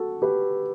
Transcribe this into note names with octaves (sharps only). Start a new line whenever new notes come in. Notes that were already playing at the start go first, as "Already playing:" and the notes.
Already playing: F#4 A4
G4 B4